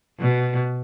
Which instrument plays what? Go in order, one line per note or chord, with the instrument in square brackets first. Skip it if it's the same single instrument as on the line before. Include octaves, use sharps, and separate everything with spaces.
[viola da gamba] B2